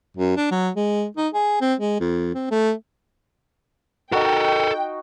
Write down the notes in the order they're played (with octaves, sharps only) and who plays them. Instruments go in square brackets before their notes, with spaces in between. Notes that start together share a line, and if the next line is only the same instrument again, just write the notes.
[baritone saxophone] F#2
D4
F#3
G#3
D#4
G#4
C4
G#3
F2
C4
A3
[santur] D#4 F#4 [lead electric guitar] A4 A#4 [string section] G5